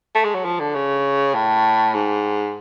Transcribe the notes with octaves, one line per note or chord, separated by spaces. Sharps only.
A3
G#3
F#3
F3
D3
C#3
A2
G#2